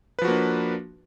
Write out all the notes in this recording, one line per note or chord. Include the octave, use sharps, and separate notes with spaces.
F3 A#3 D4 F#4 B4